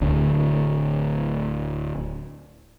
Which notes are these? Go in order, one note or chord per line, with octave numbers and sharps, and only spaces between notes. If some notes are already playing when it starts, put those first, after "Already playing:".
D1 D2